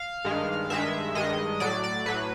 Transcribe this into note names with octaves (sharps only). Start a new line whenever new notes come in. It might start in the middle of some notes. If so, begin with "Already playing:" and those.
Already playing: F5
G2 D#3 G#3
G2 D#3 G#3 E5
G2 D#3 G#3 D#5
A2 F#3 D5
D5
A2 F#3 B4